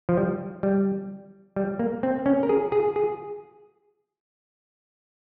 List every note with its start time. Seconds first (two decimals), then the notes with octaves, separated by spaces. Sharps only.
0.09 F3
0.17 G3
0.63 G3
1.56 G3
1.79 A#3
2.03 C4
2.26 C#4
2.43 A#4
2.49 G#4
2.72 G#4
2.96 G#4